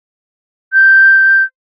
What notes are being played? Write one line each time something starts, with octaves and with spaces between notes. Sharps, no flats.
G6